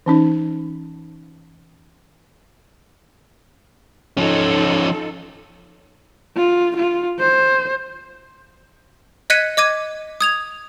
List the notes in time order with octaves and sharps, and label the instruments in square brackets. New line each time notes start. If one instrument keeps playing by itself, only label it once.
[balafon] E3 C#4 D#4
[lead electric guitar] F3 C#4 [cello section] D#4 F4 A4
[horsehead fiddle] F4
F4
C5
[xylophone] D#5 F#6 G#6 B6 C#7 D#7
D#5 D6 G#6 D#7
D#6 G#6 F7